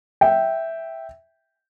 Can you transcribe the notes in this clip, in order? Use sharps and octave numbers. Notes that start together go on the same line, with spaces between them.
E5 G5